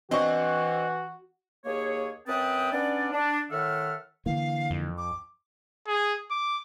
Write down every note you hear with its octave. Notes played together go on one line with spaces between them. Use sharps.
E3 C4 D4 F#4 D#5 C#6
D#2 A#3 G#4 C#5
F#2 C4 B4 G5 A5 D#6
B3 C#4 D4 D5
D4
A2 D#3 A4 E5 F#5 F6
D3 E3 A#3 F5
F2
D6
G#4
D6